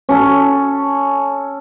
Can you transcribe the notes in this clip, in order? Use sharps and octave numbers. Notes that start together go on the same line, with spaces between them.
C#4 A4